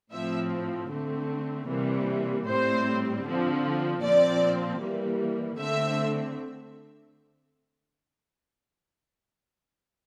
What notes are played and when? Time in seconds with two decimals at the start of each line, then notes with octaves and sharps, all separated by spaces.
0.12 A2 F3 C4 E5
0.90 D3 A3 C4
1.68 C3 E3 G3 A#3
2.46 A2 G3 C4 C5
3.25 D3 F3 C4
4.02 A#2 F3 C4 D5
4.80 E3 G3 A#3
5.58 D3 A3 C4 E5